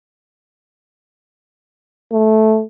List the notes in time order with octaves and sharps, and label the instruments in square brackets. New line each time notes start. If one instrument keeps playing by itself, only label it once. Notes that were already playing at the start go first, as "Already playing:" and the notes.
[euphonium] A3